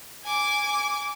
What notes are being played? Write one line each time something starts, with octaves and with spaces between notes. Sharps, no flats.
G#5 D6